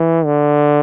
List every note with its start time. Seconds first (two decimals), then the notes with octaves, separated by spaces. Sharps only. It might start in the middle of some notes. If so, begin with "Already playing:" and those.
Already playing: E3
0.25 D3